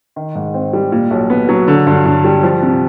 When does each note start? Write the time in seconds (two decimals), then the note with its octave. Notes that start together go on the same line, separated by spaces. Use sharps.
0.16 D#3
0.35 G#2
0.54 C4
0.73 G3
0.92 A#2
1.10 B1
1.30 B3
1.49 F#3
1.68 D3
1.87 G2
2.05 G2
2.25 G3
2.43 F3
2.62 C3